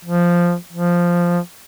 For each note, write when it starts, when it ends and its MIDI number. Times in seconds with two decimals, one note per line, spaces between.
0.05 0.55 53
0.73 1.39 53